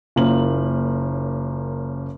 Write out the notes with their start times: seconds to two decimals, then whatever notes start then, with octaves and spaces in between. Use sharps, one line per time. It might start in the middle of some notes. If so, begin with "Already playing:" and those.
0.16 F#1 A#3 C#4 F4 F#7